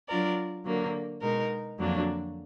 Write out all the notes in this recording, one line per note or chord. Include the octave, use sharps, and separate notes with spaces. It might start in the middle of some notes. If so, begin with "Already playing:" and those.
F#3 D4 F4 A#4 D5
D3 F#3 A#3
B2 G#3 D#4 A#4
F2 D3 F#3 A#3 D4